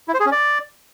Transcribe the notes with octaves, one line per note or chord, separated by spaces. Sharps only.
E4
C5
G#4
C#4
D5